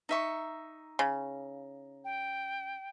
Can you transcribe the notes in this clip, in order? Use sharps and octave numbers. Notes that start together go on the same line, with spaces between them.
D#4 E5 C#6
C#3
G5